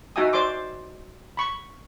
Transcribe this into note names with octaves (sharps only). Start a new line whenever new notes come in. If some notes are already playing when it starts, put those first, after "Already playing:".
D#4 F#4 E5 G5 G#5 D#6
C5 D5 C6 D6
B5 C#6